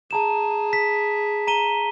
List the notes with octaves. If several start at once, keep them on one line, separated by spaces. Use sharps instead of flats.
G#4 A5 A#5 E7
B6
A#5 D#7 G7